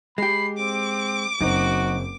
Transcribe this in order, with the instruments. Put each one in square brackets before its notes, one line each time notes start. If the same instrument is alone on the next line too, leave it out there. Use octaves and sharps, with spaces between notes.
[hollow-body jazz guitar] G#3 G4 [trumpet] B5 [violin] C7
[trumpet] C4 [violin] D6
[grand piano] F#1 C4 [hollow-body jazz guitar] F#2 D#4 [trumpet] F#4